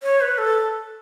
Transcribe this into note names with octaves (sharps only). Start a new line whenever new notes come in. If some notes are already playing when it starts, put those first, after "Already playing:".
C#5
B4
A4